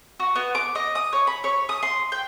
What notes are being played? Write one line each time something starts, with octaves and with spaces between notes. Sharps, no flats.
F#4
B3
D6
D#5
D#6
C#5
B5
C#5
D#6
C6
G5